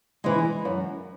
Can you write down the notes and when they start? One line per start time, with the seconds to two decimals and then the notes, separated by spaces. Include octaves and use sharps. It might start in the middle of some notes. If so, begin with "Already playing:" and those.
0.24 E3 G#3
0.65 F#2